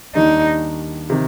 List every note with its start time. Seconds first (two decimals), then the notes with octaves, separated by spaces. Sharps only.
0.15 D#2 D#3 G3 D4 D#4
1.10 C3 D#3